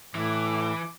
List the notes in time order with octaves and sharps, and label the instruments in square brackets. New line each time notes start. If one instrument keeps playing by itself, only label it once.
[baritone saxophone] A2 [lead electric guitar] E3 [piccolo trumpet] D6